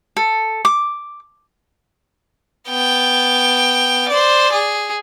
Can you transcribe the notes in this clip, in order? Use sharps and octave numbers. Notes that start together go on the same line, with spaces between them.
A4
D6
B3 G5
C5 D5
G#4